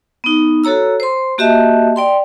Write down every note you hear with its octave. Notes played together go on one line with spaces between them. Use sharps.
B3 D#4
F#4 A4 C#5 A#5 E6
C5 C6
A#3 F#4 G4 D#5 E5 A5
D5 G5 C6